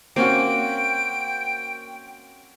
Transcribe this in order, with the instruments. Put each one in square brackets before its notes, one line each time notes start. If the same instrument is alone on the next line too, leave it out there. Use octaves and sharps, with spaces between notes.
[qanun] A#3 [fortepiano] C4 C#4 F#4 [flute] G5 [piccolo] D7